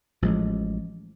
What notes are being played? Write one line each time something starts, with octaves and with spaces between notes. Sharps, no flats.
A1 F3 G#3